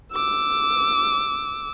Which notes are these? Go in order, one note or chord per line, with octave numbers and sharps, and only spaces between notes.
D6 E6